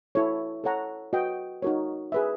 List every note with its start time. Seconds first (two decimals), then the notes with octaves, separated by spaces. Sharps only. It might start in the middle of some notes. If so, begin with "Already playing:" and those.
0.15 E4 A4 C#5
0.64 A4 C#5 F#5 A#5
1.13 F#4 B4 D#5 G5
1.62 D#4 F#4 A#4 C#5
2.12 G#4 B4 E5